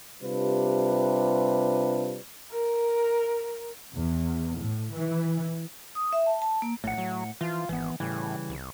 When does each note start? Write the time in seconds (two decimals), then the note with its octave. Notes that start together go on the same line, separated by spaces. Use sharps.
0.23 C3 G3 D4 F4 B4
2.51 A#4
3.94 E2
4.58 A2
4.93 E3
5.95 D#6
6.13 E5
6.26 A5
6.42 A5
6.62 A#3
6.84 A#1 A2 F#5
6.98 F#3
7.41 E3 F3 F4
7.69 G#1 E3 B3
8.00 A2 C#3 E3 G3
8.49 C2